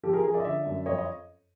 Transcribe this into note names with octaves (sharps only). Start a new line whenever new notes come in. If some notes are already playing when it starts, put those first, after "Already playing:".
F3 G4 A4
G#4 A#4
F3 G#4 A#4
D5 E5
D#5
D3 D5 E5
F#2
F2 C#5 D#5
D#5